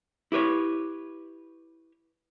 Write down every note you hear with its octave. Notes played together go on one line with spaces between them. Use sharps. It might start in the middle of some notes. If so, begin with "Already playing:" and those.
E4 G4 B4 C#5